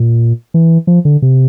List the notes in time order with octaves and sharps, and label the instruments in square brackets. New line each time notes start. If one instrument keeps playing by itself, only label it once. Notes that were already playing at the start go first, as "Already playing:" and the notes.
Already playing: [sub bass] A#2
E3
F3
D3
C3